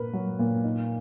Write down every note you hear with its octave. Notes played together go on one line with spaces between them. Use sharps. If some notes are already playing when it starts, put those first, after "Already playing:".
Already playing: A#2 A#3 A#4 B4
F#3
A#2
D#4